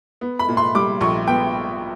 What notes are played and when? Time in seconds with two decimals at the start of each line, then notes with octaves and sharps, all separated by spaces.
0.21 B3
0.39 B5
0.48 A#2
0.57 C6
0.75 G3 D6
1.01 A#1 C#6
1.27 B3 G5